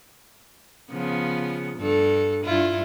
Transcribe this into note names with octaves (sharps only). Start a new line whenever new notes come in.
C#3 F3 B3
G2 A4
G2 E4 F4